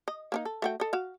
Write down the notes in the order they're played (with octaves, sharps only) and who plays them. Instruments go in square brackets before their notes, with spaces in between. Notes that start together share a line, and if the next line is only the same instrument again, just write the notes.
[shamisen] D#5
A#3 D4 D#4
A4
A3 F#4 G5
A4 D#5
F#4 F5